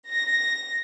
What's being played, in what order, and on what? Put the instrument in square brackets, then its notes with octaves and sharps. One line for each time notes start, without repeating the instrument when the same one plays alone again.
[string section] A#6